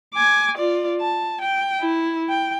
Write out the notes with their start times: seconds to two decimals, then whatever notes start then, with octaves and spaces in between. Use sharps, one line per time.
0.14 G#5 D6
0.58 F4 D5
1.00 A5
1.41 G5
1.81 E4
2.29 G5